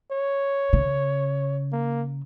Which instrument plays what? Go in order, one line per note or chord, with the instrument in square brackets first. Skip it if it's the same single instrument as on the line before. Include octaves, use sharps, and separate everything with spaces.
[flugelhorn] C#5
[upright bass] C#3
[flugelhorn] A#3